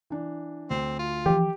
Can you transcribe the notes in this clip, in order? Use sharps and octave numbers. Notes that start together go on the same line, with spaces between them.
E3 D4
D2 C4
F4
E3 F3 G4